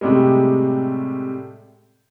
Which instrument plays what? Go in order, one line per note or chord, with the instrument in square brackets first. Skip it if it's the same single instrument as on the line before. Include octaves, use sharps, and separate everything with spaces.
[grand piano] A2 C3 G3 G#3